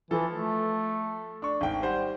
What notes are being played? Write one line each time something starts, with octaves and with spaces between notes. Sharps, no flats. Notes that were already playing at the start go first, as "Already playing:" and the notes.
E3 F3 A4
A3
D4 C#6
G#1 G5
G3 C5 F#5